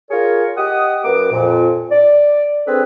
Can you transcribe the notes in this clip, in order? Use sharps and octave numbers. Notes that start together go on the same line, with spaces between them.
F4 G#4 A#4 C#5
G4 D#5 F#5 D#6
F#2 A#3 B4 D6
F2 A#2
D5
C4 D4 G#4 A4 B4